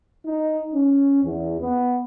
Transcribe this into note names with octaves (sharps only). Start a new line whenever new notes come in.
D#4
C#4
E2
B3